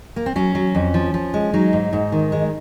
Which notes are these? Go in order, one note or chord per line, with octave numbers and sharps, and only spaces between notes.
A#3
C4
F#3 C#4
F#3
F2
F3
F3
G#3
F#3 D#4
G#2
G#2
D#3
G#3